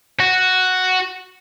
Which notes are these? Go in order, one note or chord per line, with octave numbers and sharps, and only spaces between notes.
F#4